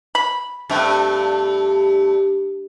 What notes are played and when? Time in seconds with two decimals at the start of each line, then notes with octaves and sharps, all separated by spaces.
0.15 B5
0.70 G2 C3 A3 G5